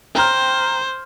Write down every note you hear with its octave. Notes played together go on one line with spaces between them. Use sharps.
C5 G5 A#5 F6